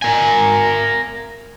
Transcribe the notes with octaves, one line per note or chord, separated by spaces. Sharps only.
A#4 G#5